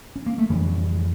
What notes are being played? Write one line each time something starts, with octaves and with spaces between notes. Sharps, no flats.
C#4
A#3
A3
F2 D3 E3 G3